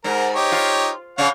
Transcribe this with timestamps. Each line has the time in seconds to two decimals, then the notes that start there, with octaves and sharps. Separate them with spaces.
0.04 G#2 A#4
0.35 D#4 G4 C#5
0.52 F4
1.18 C#3 C#5 F5 F#5